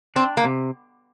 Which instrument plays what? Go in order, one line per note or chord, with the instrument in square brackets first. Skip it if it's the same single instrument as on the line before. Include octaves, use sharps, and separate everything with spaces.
[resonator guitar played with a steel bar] C4 [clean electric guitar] D4
[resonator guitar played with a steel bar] A#3
[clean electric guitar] C3